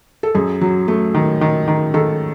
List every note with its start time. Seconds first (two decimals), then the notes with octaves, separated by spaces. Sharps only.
0.23 A4
0.35 F#2 G#4
0.61 F#3
0.88 A3
1.15 D#3
1.41 D#3
1.68 D#3
1.94 D#3 A4